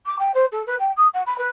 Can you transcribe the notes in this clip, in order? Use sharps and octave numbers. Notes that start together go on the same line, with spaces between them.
D6
G5
C5
A4
B4
G5
D#6
F#5
B5
B4